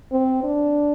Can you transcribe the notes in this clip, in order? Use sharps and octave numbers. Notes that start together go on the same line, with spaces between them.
C4
D4